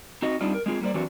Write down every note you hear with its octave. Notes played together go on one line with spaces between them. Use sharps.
C4 D#4 F#4 D#5
G3 C4 D4 D#4 F4
A#4
G#3 C4 F4 G#4
G3 A#3 F4 C5 D5
E3 F#3 C4 D4 F#4